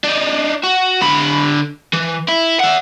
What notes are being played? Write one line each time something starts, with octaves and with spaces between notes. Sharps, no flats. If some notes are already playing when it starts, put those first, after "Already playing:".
D4 D#4
F#4
D3 B5
E3
E4
E5 F#5